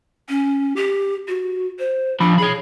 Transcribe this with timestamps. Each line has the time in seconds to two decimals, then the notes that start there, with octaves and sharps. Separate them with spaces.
0.29 C#4
0.76 G4
1.28 F#4
1.79 C5
2.20 F3 D4 B5
2.38 G#4 C#5 B5